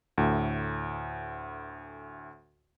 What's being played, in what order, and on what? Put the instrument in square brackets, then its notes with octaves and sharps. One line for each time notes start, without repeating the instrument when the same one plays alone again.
[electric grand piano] D2 A2